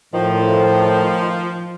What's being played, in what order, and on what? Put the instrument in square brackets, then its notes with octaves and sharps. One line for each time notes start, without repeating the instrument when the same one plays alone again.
[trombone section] A2 [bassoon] D#3 [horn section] F3